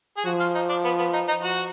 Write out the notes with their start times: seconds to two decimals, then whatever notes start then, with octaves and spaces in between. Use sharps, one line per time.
0.17 G#4
0.25 F3 F#4
0.40 F4
0.55 D#4
0.69 D4
0.85 B3
0.99 B3
1.13 D#4
1.28 D#4
1.43 F#4